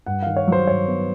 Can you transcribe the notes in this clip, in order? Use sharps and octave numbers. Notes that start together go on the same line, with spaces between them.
G2 F#5
D#3 F5
C#5
F#3 C5
G2 C#5
B3